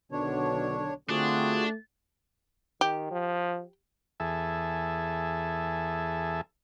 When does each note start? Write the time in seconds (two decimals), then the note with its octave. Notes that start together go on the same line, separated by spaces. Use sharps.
0.12 B1 B2 D3 D#3 D4 C#5
1.10 D3 A3 C4 D4 F4 F#4 G#4
2.81 D#3 G4
3.11 F3
4.20 E2 G#4 A4 E5